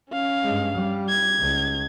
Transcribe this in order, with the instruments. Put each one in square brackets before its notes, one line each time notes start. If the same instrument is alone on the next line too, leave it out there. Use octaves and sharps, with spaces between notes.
[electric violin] C#4 F5
[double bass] G2 G#3
G3
[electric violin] G#6
[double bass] C#2